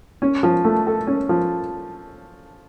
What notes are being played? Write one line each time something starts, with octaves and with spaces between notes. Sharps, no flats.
C#4
F3
A3
A4
C#4
F3